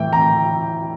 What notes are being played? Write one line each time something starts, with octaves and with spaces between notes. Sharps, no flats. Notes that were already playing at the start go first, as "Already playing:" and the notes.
Already playing: A2 E3 G5
A#5